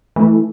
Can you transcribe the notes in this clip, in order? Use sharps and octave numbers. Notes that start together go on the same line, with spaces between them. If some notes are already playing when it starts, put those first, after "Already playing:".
E3 A3